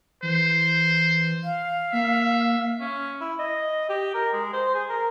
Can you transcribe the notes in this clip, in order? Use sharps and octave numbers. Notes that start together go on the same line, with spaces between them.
E3 C5
F5
A#3 E5
C#4
E4
D#5
G4
A#4
G#3
C5
G#4
A#4